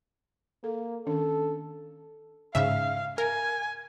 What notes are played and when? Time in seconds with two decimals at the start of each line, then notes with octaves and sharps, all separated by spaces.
0.64 A#3 A4
1.07 D#3 C#4 D4 A4
2.55 G#2 C#3 E5 F5
3.18 A#4 G#5